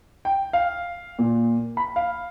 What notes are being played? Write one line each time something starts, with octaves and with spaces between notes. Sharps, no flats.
G5
F5
A#2
B5
F5